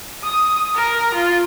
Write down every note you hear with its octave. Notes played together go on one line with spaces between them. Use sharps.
D#6
A#4
F4